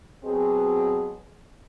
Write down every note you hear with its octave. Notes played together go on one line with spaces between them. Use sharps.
B2 F#3 C4 G#4